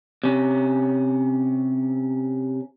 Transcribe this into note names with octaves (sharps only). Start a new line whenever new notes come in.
C3 C#4